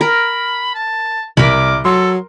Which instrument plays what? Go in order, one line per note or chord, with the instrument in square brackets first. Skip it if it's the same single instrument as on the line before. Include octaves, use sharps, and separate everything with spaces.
[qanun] A#4 [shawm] B5
[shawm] A5
[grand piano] C2 [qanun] A#4 B5 [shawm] D6
[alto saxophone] F#3 [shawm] A4 [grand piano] C6